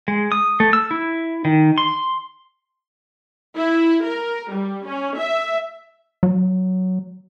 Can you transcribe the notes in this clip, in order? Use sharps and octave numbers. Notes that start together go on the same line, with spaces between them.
G#3
D#6
A3
E6
E4
D#3
C6
E4
A#4
G3
C#4
E5
F#3